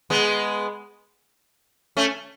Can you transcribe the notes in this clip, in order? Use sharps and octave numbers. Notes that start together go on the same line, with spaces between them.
G#3 B3
A3 C#4